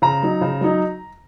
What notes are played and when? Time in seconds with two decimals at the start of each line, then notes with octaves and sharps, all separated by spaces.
0.02 C#3 A#5
0.23 F#3 D#4
0.41 C#3
0.61 F#3 D#4